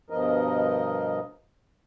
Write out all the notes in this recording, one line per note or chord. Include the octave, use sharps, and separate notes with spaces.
G2 B2 F3 A#4 D#5